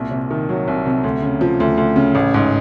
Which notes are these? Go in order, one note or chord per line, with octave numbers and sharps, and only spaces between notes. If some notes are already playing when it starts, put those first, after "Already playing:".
Already playing: C2 A#2
C3
D#3
F#3
C2
C3
D2
C#3
F3
D2
D2
C#3
A1
G#2